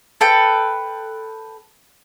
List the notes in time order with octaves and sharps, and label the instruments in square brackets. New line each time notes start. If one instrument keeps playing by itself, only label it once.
[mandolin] A4 B4 G5